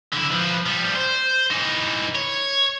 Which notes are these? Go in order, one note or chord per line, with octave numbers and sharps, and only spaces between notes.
D3 E4
F3 B4
F3 G3
C5
E3 D#4
C#5